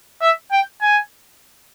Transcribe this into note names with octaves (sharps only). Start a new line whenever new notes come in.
E5
G5
G#5